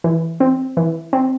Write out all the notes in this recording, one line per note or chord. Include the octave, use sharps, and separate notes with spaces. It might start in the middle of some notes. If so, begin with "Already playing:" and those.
E3
C4
E3
C4